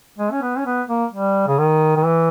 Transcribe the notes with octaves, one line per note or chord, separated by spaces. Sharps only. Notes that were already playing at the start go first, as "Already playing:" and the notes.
G#3
C#4
B3
C#4
B3
A#3
G3
C#3
D#3
D#3
E3